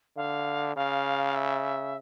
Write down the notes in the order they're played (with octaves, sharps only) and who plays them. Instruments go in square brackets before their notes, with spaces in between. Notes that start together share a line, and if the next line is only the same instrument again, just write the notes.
[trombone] D3 [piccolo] F5
[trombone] C#3 [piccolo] F5
[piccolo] E5